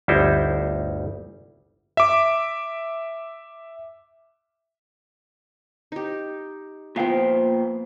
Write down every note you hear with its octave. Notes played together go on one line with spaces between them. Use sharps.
G1 D2 G3 D#4 E4 C5
E5 D6
D#4 G4
A#2 F3 B3 F5 G5